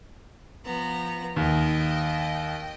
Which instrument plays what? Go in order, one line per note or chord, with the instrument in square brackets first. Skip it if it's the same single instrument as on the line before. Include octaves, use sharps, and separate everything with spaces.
[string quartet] F3 B3 A#5
[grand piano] D#2 [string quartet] D#5 G5